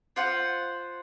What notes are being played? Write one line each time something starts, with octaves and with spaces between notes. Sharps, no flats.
F4 C5 F#5